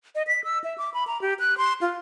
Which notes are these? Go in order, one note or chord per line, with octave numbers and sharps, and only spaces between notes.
D#5
B6
E6
E5
D6
B5
A#5
G4
F#6
C6
F4